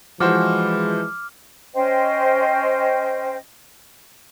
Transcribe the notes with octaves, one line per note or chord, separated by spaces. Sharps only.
E3 F3 G#3 F#4 C5 D6 F6
C#4 C5 D#5 G5